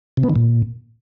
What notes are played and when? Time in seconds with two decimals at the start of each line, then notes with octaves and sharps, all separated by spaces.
0.17 C3
0.23 B3
0.29 D#3
0.36 A#2